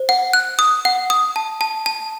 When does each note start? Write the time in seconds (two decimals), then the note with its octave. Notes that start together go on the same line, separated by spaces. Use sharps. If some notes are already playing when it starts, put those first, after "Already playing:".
Already playing: C5
0.09 F#5
0.33 F#6
0.59 D#6
0.85 F#5
1.10 D#6
1.36 A5
1.61 A5
1.86 A5